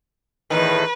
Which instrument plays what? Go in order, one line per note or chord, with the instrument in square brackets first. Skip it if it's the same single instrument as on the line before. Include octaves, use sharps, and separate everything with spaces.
[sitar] E2 A2 D#3 [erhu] B4